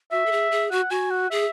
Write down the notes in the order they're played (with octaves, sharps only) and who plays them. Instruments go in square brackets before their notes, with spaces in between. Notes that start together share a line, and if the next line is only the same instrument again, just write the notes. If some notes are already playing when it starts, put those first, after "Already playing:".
[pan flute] F#4 [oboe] E5
[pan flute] A4
G#4
G#4
[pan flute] F#4 [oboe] F#5
[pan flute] F#4 [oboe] G#5
[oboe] F#5
[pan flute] G#4 [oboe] E5